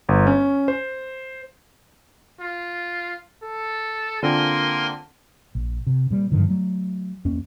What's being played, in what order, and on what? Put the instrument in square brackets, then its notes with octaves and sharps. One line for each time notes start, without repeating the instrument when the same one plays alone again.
[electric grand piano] G1
C#4
C5
[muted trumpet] F4
A4
[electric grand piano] D3 C4 F4 [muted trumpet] A#3 [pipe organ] A#4 G#5 C6
[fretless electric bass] A#1
C3
A#2 G3
G2 D3 D#3 F3
F#3 A3
E2 A#3 C#4